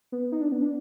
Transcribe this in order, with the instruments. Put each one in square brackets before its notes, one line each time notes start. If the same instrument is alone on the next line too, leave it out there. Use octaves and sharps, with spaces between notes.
[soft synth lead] B3
D#4
D4
B3
D4